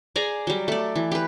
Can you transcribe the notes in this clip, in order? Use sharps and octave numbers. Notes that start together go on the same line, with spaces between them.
G#4 D5 G#5 A#5
F#3 G3
A3 D5
E3
G4 B4